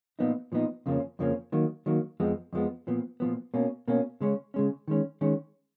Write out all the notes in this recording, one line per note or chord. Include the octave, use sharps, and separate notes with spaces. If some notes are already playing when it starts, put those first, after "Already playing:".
A#2 F3 B3 D#4
A#2 F3 B3 D#4
F2 C#3 F3 A#3 C#4
F2 C#3 F3 A#3 C#4
D#3 F#3 A#3
D#3 F#3 A#3
F2 F3 G#3 B3
F2 F3 G#3 B3
A#2 F3 B3
A#2 F3 B3
B2 A#3 C#4
B2 A#3 C#4
C#3 G#3 C#4
C#3 G#3 C#4
D#3 G#3 C#4
D#3 G#3 C#4